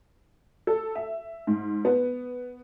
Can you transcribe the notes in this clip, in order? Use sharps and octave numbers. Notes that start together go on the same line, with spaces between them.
A4
E5
G#2
B3